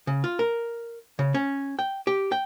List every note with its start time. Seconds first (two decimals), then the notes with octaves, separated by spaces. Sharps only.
0.07 C#3
0.24 F4
0.39 A#4
1.19 C#3
1.34 C#4
1.79 G5
2.07 G4
2.32 G5